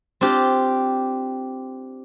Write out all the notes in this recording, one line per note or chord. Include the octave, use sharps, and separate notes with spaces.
C4 D4 F4 G4